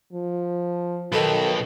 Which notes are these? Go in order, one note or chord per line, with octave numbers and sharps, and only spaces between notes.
F3
B1 B2 D#3 A4 B4